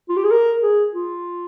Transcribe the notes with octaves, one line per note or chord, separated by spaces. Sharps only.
F4
G4
G#4
A#4
G#4
F4